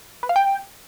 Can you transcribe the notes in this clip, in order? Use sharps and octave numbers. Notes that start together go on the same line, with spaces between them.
B4
F5
G5